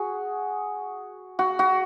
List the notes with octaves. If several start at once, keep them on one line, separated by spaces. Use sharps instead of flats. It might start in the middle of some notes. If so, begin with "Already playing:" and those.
Already playing: F#4 G#4
F#4
F#4